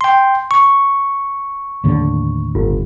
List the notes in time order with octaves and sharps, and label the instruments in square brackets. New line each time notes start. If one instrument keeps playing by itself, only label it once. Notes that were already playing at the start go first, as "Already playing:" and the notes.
[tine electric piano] G5 C6
C#6
[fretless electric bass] D#2 A2 D3
[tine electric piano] G1